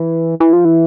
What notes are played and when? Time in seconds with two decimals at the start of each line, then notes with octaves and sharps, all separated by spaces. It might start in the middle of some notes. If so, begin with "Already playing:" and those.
Already playing: E3
0.40 E3
0.53 F3
0.65 E3